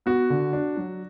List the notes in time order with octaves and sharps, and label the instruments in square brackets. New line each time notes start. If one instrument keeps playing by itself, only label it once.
[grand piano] B3 F#4
D3
D4
F#3